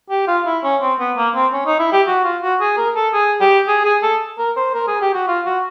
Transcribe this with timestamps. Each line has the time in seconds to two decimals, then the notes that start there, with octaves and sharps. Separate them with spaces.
0.10 G4
0.28 F4
0.46 E4
0.63 C#4
0.82 C4
1.00 B3
1.17 A#3
1.35 C4
1.53 C#4
1.66 D#4
1.79 E4
1.92 G4
2.07 F#4
2.24 F4
2.42 F#4
2.61 G#4
2.77 A#4
2.96 A4
3.13 G#4
3.41 G4
3.68 G#4
3.85 G#4
4.03 A4
4.38 A#4
4.57 C5
4.74 A#4
4.87 G#4
5.01 G4
5.14 F#4
5.28 F4
5.46 F#4